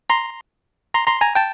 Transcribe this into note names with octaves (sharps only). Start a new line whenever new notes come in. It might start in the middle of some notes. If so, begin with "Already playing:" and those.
A#5 C6
A#5 C6
A#5 C6
G#5 A#5
G5 A5